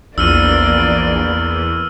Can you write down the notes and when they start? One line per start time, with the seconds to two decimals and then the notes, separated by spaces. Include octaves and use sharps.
0.18 A#1 E2 A#3 D5 E6 F6 D#7